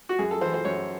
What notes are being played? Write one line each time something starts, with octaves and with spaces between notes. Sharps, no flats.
F#4
F#2 G#4
A4
E3 C5
C5
F#2 C#5